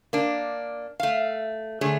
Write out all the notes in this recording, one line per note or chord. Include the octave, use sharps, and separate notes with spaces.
A#3 D4
A3 F5
D3 A3 G#4 C#5